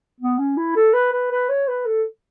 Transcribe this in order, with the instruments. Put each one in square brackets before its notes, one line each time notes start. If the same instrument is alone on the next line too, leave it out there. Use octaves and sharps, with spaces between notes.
[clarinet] B3
C#4
E4
A4
B4
B4
B4
C#5
B4
A4